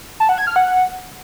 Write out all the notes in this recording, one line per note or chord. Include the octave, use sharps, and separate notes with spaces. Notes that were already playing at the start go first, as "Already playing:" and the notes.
A5
F#5
G#6
F6
F#5